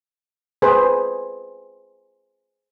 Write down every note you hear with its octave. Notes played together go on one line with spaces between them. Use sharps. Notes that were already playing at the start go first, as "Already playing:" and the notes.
G#4 B4 C5